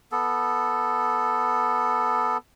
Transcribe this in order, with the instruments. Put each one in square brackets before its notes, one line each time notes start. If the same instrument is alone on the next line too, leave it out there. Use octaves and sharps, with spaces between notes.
[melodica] B3 A4